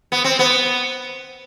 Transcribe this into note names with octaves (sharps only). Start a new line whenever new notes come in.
B3
C4
B3